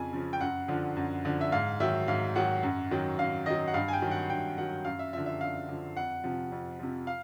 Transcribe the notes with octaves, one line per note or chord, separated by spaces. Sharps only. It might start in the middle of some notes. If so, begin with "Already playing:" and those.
Already playing: F2 C#3 F3 G#5
C#3 F3
G5
F#2 F#5
D3 F3
F#2
D3 F3
E5
G#2 F5
D#3 F#3 E5
G#2 F5
D#3 F#3 F#5
F#2
D#3 F#3
F#2 F5
D#3 F#3 D#5
F#5
G2 F5
G#5
G5
D#3 F#3
F#5
G2 G5
D#3 F#3 F#5
F#2 F5
E5
D3 F3 E5
E5
F#2 F5
D3 F3
F2 F#5
C3 F3
F2
C3 F3
F5